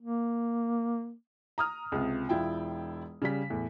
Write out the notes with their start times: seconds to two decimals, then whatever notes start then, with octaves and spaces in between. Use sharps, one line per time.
0.01 A#3
1.58 A#5 D#6 F6
1.92 C#2 C3
2.29 E1 E4 F4 G5
3.22 C#3 G3 B6
3.50 E2 A2